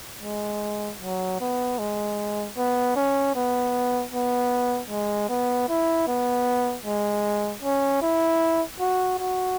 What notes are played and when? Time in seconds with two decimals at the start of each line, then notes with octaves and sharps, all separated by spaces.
0.23 G#3
1.01 F#3
1.40 B3
1.78 G#3
2.57 B3
2.96 C#4
3.35 B3
4.12 B3
4.90 G#3
5.29 B3
5.68 E4
6.08 B3
6.85 G#3
7.62 C#4
8.02 E4
8.80 F#4
9.19 F#4